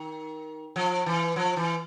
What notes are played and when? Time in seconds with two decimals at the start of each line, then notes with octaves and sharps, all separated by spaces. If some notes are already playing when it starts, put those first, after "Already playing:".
Already playing: D#3
0.76 F3
1.06 E3
1.36 F3
1.57 E3